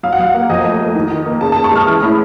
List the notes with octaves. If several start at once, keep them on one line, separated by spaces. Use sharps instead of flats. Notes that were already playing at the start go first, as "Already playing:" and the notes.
F#3 F5
F#5
F#3 F5
A#3
F2 D#5
A3
A3
D#3
D#3
A#3
C#3 A5
A5
C#3
C#6
G#3 F6
E3 F6
A2